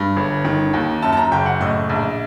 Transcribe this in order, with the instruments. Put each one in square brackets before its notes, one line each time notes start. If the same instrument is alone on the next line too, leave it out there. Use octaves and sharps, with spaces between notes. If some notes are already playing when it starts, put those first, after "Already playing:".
Already playing: [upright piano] G2
G1
D#3
D#2
F#2 A5
A5
A#5
F#1 G5
F#5
A2 D#5
A#1